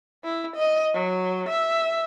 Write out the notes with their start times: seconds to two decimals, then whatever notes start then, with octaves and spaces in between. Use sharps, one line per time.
0.24 E4
0.56 D#5
0.94 F#3
1.49 E5